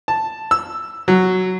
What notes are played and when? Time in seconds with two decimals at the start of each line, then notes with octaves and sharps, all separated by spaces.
0.08 A5
0.51 E6
1.08 F#3